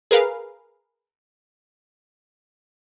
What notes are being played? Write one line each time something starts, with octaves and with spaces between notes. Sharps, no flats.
G#4 A#4 B4 F5